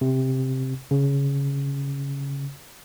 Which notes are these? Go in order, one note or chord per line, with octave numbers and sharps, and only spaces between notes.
C3
C#3